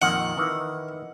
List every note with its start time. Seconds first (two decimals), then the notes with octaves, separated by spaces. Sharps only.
0.02 F2 A#2 D#3 F#5
0.37 D#3 E3